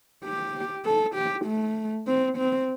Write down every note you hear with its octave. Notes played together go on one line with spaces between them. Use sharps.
G4
A4
G4
A3
C4
C4